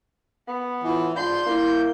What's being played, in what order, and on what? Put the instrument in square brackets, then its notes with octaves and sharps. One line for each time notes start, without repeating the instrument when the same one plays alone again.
[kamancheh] B3
[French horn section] A2 F3 [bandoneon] E3
[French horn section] G#2 F4 [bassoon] D4 [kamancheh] C6 [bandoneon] G6
[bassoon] A#3 [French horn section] E4